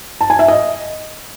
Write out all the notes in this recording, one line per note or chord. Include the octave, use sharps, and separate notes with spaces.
A5
G#5
E5
D#5